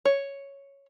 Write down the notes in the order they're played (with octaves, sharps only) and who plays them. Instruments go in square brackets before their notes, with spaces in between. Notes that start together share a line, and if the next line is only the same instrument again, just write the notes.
[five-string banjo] C#5